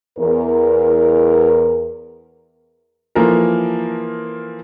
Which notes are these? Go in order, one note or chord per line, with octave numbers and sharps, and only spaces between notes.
E2 A#4
E3 F3 A#3 A4 A#4